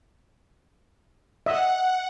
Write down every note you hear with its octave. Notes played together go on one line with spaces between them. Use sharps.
D#5 E5 F#5